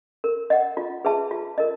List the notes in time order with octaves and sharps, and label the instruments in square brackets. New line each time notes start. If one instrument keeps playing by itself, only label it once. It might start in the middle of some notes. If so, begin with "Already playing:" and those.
[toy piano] A#4
D#5 F#5
F4
G#4 B4 E5 A5
F4
A#4 D#5